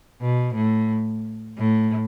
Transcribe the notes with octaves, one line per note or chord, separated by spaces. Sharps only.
B2
A2
A2